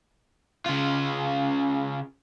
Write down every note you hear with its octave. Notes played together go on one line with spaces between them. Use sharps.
C#3 F4